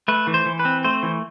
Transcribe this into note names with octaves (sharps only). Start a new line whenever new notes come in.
A3 B4
E3
C5
E3
B4
C4
A3 C5
E3